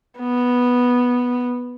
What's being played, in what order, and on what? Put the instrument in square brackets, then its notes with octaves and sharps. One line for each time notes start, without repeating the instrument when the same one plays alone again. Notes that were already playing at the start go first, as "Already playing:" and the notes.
[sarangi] B3